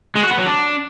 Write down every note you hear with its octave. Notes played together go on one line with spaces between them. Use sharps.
G#3
F#4
B3
F#3
D4